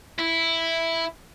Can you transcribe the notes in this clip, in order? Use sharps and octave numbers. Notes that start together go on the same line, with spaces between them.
E4